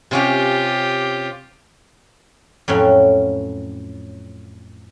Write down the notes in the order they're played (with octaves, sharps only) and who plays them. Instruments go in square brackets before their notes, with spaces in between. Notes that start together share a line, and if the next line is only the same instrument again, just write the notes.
[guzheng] C3 C#4 F5 [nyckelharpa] F4 G4
[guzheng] F2 A2 F#3 C#4 G5